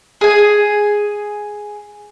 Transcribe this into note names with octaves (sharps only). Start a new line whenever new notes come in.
G#4 G#5